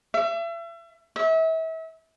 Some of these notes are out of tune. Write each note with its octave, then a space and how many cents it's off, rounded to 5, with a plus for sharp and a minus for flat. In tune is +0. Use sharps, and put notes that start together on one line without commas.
E5 +35
E5 -35